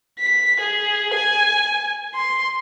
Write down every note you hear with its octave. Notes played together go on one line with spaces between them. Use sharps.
B6
G#4
G#5
C6